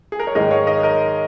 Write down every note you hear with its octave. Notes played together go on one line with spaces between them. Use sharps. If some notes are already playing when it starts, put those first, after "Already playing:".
G#4
A#4
C#5
G#2 D#3 G#3 A#4 D#5
C#5 F5
A#4 D#5
A#4 D#5